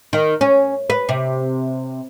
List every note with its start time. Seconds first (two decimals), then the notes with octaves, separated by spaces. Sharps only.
0.13 D#3
0.41 C#4
0.90 B4
1.09 C3